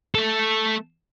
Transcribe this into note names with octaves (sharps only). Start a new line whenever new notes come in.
A3 A4